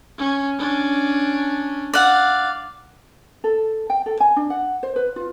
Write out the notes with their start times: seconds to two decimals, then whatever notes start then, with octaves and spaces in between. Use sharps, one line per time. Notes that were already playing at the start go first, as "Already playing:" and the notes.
0.18 C#4
0.58 C#4 D4
1.94 D5 F5 F#5
3.44 A4
3.90 G5
4.06 A4
4.20 G#5
4.36 D4
4.50 F#5
4.83 C5
4.96 B4
5.16 F4